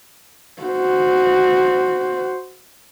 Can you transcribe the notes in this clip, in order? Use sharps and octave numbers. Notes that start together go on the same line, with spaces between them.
F#4 C5